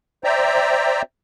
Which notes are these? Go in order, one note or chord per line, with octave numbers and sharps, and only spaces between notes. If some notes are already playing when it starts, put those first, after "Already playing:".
C5 D5 E5 G5 A#5